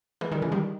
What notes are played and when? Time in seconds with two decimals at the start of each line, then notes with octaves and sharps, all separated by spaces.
0.21 E3 G#3
0.32 D#3 G3
0.42 C#3 E3
0.52 D#3 G3